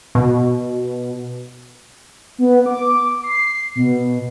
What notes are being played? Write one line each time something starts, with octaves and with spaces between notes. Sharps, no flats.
B2
B3
D6
C7
B2